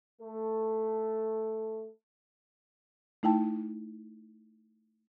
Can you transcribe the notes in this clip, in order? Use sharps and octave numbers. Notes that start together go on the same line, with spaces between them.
A3 A4
A3 D#4 E4 G5 A5